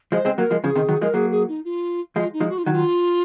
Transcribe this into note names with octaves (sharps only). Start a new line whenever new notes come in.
F3 G#3 C5
G#3 C4
F#3 A#3 A#4
F3 G#3
C#3 F3 G#4
C3 D#3
D#3 F#3
F3 G#3 A#4
F#3 A#3 G#4
G#4
D#4
F4
F3 G#3 F4
D#4
F3 G#3
F#4
F4
D#3 F#3 D#4
F4